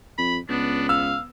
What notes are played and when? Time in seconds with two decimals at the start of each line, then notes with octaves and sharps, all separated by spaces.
0.18 F2 B5
0.49 C#2 B3 D4
0.89 F5 E6